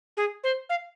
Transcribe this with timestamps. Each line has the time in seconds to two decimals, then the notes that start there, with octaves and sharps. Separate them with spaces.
0.17 G#4
0.44 C5
0.69 F5